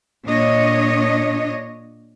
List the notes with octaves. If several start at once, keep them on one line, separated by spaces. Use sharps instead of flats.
A#2 D4 C#5 D#5